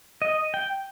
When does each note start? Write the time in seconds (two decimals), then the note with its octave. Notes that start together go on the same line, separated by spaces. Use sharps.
0.22 D#5
0.54 G5